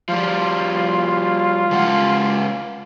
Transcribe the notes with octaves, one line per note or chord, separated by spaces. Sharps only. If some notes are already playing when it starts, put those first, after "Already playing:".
F3 G3 F4
C#3 G#3 F#5